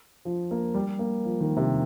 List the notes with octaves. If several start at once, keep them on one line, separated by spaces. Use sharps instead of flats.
F3
A#3
G3
A#3
F3
D#3
C3